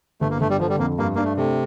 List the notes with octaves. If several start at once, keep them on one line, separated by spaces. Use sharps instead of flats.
G1 A3
A#3
G1 A3
G3
D3 F3
G3
F2 A#3
G2 A#3
A#3 D4
A3
C3 A3